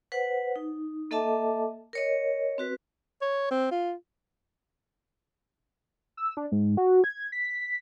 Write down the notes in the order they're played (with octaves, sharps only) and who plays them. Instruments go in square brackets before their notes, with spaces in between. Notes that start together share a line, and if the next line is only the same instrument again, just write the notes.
[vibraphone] B4 C5 F#5
D#4
A#3 A4 D#5 E5 A5 D6
A#4 C#5 D#5
C4 F#4 B4
[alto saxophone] C#5
C4
F4
[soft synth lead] E6
D4
G#2
F#4
G#6
B6